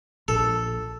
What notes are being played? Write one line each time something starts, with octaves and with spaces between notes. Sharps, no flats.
A#1 A4